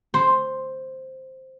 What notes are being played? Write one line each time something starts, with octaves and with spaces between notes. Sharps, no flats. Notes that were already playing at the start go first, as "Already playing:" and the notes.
C5